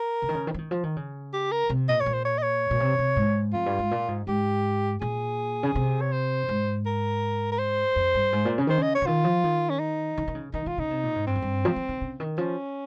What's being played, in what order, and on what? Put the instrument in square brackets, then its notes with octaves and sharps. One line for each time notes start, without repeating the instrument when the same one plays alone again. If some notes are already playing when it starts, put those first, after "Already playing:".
Already playing: [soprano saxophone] A#4
[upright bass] C#3
D#3
C#3
D#3
F3
D#3
F3
D#3
C#3
[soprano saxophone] G4
A#4
[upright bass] C3
[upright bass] A#2 [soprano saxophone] D#5
[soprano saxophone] C#5
[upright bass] A#2
[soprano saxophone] C5
C#5
D#5
C#5
[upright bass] A#2
C3
C3
G#2
[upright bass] F2 [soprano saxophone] F4
[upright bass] G2
G#2
A#2
G#2
[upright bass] G#2 [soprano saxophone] G4
[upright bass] A#2 [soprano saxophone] G#4
[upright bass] C#3
C3
[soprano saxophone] C#5
C5
[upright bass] G#2
[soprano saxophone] A#4
A#4
C5
[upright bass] F2
G2
G#2
A#2
C#3
[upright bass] D#3 [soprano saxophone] C5
[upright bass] C#3 [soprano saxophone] D#5
[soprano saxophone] C#5
[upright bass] C#3
[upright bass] D#3 [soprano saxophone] F4
[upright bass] F3
D#3
[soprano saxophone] C#4
D#4
[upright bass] D#3
D#3
C#3
[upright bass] D#3 [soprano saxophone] D#4
[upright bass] D#3 [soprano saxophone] F4
[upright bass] C#3 [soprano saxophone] D#4
[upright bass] C3
A#2
G#2
[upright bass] G2 [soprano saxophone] C4
[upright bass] F2
G2
F3
F3
D#3
C#3
D#3
[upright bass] F3 [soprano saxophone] C#4